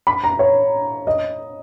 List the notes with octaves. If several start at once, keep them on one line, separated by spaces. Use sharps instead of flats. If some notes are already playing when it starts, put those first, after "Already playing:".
B5
A#5
C#5
D#5